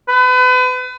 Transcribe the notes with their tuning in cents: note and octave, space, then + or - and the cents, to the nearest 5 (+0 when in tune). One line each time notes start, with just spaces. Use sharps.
B4 +35